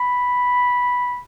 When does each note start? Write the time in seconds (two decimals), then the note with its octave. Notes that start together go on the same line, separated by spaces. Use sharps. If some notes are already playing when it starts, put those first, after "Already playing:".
Already playing: B5